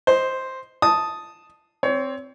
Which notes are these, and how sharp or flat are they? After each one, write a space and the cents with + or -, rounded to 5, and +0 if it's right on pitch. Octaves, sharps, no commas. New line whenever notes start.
C5 +0 D#5 +10
A5 +0 D#6 +0
C4 +0 C#5 +30